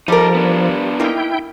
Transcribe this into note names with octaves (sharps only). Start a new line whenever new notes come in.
F3 G3 D#4 A4 A#4
B3 D4
A#3 D#4 E4 G5